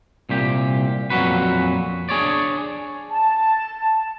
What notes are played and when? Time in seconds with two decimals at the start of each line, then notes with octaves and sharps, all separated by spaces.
0.29 C2 A#2 G4
1.10 F2 A#2 F#3 F#4 B4
2.09 D4 G#4 C#5 D5
3.10 A5